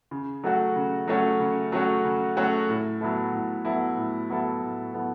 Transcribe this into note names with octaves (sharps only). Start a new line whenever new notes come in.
C#3
F#3 A3 C#4 F#4
C#3
F#3 A3 C#4 F#4
C#3
F#3 A3 C#4 F#4
C#3
F#3 A3 C#4 F#4
A2
F#3 B3 E4 A4
A2
F#3 B3 E4 A4
A2
F#3 B3 E4 A4
A2
F#3 B3 E4 A4